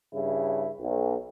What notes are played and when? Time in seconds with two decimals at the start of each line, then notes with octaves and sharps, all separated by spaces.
0.13 G2 C#3 E4
0.79 B1